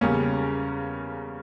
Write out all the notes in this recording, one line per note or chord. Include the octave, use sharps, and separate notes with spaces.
E2 C#3 G3 A#3 C#4